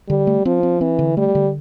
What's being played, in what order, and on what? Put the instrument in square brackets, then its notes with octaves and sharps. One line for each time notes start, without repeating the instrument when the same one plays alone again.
[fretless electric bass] D3 [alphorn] G3
[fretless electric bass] A3
[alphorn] F3 [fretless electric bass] C4
[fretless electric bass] C4
[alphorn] E3 [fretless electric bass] C4
[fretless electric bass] D3
[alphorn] G3 [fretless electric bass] A3
[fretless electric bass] D3